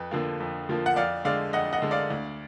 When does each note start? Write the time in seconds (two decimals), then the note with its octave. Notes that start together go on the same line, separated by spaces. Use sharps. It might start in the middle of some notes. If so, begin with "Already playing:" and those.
Already playing: F2 B4
0.11 D3 F3 A#3
0.40 F2
0.69 D3 F3 A#3
0.86 F#5
0.96 F2 D5 F5
1.25 D3 G#3 D5 F5
1.53 F2 D#5 F#5
1.73 D#5 F#5
1.82 D3 G#3
1.91 D5 F5
2.10 D2